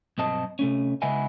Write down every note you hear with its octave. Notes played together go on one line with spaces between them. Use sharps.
B1 G2 C4 D#5 A5
C3 A3 C#4
C#3 G#3 B3 E4 D#5 G#5